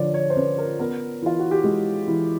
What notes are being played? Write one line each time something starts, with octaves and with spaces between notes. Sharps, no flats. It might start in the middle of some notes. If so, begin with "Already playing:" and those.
Already playing: D3 F3 C#5 D5
C#5
C5
C#4 B4
A#4
B3 A#4
E3 F4
F#4
G4
G#3 G#4
E3